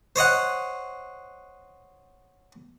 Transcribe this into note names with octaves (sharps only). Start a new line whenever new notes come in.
C5 C#5 D#5 F#5